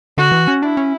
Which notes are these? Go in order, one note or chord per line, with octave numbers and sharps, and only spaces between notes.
D3 F#4
E3
C#4
D4 E4
C#4